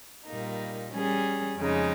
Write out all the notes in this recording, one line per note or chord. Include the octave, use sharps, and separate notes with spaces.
A#2 G3 A#3 D#4
G3 C#4 G#4
F2 C#3 G#3 D#4